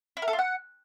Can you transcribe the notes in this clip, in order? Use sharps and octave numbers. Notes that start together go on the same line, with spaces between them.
E4
A#4
A4
F4
F#5